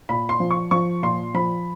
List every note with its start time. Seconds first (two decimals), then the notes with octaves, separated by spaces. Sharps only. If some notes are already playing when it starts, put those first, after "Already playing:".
0.09 A#2 B5
0.29 C6
0.40 F3
0.51 C#6
0.71 F3 C#6
1.03 A#2 C6
1.34 F3 B5